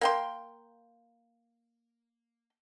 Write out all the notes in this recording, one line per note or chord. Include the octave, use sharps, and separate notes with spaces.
A#3 G5 C6